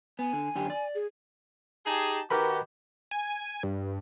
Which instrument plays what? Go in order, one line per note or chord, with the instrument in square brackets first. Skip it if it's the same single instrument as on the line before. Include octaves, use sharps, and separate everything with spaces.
[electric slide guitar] B3 [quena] G#5
[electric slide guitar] D3
F#2 D3 G4
D5
[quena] G#4
[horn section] D#4 G4 G#4 [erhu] A5
[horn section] D#3 F#4 [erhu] G4 [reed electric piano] A#4 B4 B5
[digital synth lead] G#5
G2